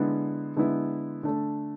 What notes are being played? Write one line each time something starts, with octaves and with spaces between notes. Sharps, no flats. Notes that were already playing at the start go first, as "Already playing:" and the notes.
Already playing: D3 G#3 B3 E4
D3 G#3 B3 E4
D3 A3 D4 A4